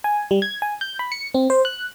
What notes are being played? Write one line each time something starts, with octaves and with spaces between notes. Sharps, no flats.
G#5
G3
G#6
G#5
G6
B5
C#7
C4
C5
F#6